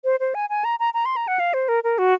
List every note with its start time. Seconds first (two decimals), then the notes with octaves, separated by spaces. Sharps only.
0.05 C5
0.20 C5
0.35 G#5
0.50 G#5
0.64 A#5
0.80 A#5
0.94 A#5
1.05 C6
1.16 A#5
1.28 F#5
1.39 F5
1.54 C5
1.69 A#4
1.84 A#4
1.98 F#4